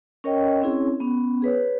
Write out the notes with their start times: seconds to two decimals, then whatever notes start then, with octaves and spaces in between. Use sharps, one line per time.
0.24 C#4 A#4 C#5 D#5 G5
0.61 C4 C#4 E4 G#4 C#5
1.00 B3 C#4
1.42 G#4 B4 C#5